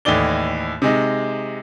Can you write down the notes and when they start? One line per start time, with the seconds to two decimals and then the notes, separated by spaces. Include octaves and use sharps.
0.05 D#2 A2 E3 D#4 D5 G7
0.82 C3 G#3 D#4